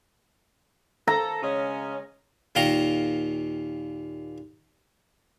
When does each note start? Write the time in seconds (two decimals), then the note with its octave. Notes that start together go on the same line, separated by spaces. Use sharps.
1.08 A4 A#5
1.43 C#3 G#3 C#4
2.55 D#2 A#2 F5 G5 A#5 C#6